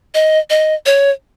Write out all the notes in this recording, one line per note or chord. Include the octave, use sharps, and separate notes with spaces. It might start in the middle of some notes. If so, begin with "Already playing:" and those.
D#5
D#5
C#5